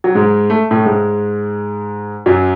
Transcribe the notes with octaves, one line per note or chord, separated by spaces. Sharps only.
F#3
G#2 G#3
A3
A2 A3
G#2 G#3
F#2 F#3